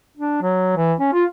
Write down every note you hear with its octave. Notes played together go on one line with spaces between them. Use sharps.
D4
F#3
E3
C#4
F4